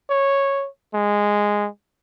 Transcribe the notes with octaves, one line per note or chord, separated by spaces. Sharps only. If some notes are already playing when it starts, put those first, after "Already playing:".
C#5
G#3